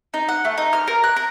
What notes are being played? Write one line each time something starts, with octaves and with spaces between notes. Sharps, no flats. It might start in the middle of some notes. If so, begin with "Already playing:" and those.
D#4
F#5
A3
D#4
F6
A#4
F#6
A#4